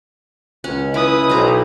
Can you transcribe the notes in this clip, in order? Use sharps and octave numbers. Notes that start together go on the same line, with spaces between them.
C#2 C#4
E4 B4 D#6
B1 C5 A#5